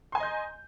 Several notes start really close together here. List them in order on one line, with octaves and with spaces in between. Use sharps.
C6 G#5 A#5 D#5 G6